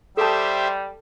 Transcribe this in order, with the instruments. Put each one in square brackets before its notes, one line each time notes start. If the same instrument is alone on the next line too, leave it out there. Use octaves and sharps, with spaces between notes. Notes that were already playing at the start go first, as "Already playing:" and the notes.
[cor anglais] G3 [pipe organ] G4 C5 E5 [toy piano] A4 A5